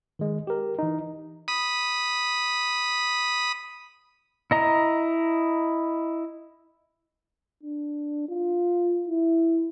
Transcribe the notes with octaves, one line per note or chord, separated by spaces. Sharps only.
D#3 G#3
G4 A#4
E3 D#4
B5 D#6
E4 D#5 A#5
D4
F4
E4